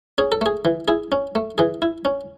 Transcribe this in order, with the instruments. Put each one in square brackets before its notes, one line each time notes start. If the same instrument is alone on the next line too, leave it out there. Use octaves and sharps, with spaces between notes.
[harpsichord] C#4 G#4
A4
A3 G#4
E3
E4 G#4
C#4
A3
E3 G#4
E4
C#4